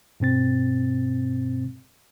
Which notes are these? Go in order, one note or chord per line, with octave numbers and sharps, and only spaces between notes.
G2 B2 C4 A6